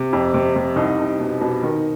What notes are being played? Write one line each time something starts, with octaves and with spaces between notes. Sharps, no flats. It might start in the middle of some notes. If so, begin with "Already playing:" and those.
Already playing: C3
F2
C3
C3
C2 D#4
C2
B2
B2
D#3